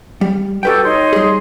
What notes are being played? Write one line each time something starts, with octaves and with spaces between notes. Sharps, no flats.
G3
F#4 G4 A4 B4 G5 G6
D#4 C#5 C6
G3 G#4